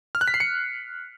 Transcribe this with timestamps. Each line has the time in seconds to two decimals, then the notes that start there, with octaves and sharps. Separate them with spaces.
0.15 F6
0.21 F#6
0.28 B6
0.34 C7
0.40 C#7